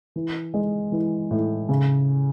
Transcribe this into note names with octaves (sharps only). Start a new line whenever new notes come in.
E3
G#3
E3
A2
C#3